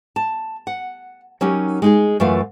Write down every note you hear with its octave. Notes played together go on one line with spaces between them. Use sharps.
A5
F#5
F#3 C#4 D#4 G4 A#4
G#3 D#4 G#4
F#2 E3 A3 F4 F5